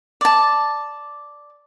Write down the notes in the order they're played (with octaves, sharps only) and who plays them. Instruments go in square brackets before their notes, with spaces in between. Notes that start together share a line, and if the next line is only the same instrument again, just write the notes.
[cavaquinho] D5 A5